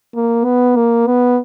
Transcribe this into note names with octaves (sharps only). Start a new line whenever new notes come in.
A#3
B3
A#3
B3